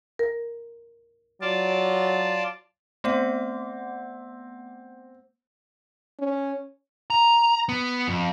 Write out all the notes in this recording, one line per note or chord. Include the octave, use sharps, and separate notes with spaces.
A#4
F#3 F4 D5 A5
A3 B3 C4 F#5
C#4
A#5
B3
F2